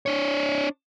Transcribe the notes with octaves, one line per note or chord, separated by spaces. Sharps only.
D4 C#5